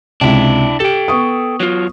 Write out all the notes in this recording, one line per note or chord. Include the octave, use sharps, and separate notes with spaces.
C#2 C3 D4 E4
G4 A4 G5
B3 C#6 D#6
F#3 F4